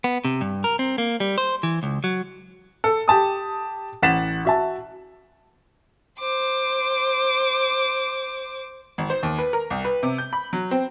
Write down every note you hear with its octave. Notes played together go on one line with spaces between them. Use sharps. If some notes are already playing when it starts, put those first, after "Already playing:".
B3
C3
G2
A#4
C4
A#3
G3
C5
E3
C#2
F#3
A4
G4 A5 D#6
A1 F#5 A6 B6 E7
F#4 E5 A5
C5 D6
G#1
C5
D#2
B4
A#4
C2
B4
C3
G6
B5
F#3
C4